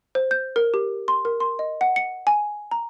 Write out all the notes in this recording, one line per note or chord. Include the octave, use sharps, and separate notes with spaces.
C5
G6
A#4
G4
C6
A#4
C6
D#5
F#5
C#7
G#5
A#5